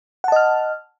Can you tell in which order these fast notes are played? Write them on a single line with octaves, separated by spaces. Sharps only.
F#5 A5 D#5 F6